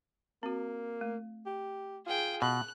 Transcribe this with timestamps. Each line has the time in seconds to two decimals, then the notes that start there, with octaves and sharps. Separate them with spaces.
0.43 A#3 C4 F#4
1.01 A3
1.46 G4
2.06 F4 G#4 G5
2.42 B2 F#6